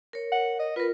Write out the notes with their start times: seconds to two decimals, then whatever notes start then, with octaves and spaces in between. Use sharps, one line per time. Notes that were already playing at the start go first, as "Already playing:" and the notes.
0.13 A#4 C#5
0.32 F#5
0.59 D#5
0.76 F4 A#4 B4